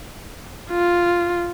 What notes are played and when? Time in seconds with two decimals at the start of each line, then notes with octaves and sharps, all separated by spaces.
0.71 F4